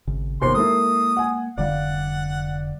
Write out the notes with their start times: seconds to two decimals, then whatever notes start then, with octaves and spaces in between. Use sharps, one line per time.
0.07 G#1 C#3
0.41 G1 D#2 C3 B3 C5 C6 C7
0.55 G#3 A#3 E4 A4 A#4 D#6
1.17 F#5 G#5
1.58 F1 D3 G3 D5 F5 F#5